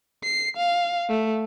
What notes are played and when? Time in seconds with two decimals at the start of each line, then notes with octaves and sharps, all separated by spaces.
0.24 C7
0.57 F5
1.09 A3